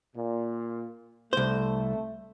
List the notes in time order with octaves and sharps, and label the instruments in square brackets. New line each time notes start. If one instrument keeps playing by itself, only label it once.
[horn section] A#2
[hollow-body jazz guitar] C2 C5 [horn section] A3